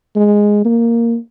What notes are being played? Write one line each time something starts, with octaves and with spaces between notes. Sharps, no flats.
G#3
A#3